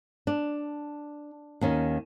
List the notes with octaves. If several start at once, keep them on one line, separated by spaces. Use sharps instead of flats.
D4
D#2 D#3 C#4